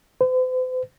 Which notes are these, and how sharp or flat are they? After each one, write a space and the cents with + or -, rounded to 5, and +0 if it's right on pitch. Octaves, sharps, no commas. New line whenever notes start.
C5 -45